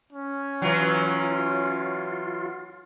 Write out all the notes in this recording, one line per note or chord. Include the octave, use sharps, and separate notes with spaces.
C#4
E3 F#3 F4